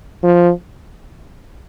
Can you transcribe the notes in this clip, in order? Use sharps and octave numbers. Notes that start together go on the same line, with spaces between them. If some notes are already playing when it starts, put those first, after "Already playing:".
F3